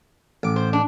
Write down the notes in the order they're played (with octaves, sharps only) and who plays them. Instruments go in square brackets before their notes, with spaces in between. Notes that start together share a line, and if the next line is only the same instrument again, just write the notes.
[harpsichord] A1 D6
[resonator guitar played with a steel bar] C5
D4